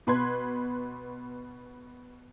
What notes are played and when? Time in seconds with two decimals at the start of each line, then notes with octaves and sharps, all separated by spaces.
0.07 B2 B4 C6 G#6